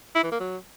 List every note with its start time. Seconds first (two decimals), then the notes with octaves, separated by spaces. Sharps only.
0.15 E4
0.23 E3
0.32 A#3
0.40 F#3